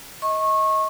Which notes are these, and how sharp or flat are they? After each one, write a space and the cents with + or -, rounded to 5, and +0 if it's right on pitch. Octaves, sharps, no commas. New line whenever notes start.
D#5 +25 C#6 -25